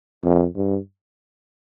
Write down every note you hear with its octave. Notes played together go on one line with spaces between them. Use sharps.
F2
G2